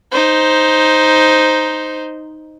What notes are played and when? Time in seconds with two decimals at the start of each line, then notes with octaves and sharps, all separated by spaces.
0.12 D#4 C5